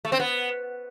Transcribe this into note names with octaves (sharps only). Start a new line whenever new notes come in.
A3
C4
B3